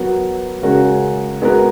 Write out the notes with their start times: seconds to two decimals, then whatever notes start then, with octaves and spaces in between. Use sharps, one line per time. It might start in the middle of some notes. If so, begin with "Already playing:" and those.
Already playing: F#3 B3 F#4 A#4
0.62 C#3 G#3 C#4 F#4 A#4
1.42 G#3 B3 F#4 A#4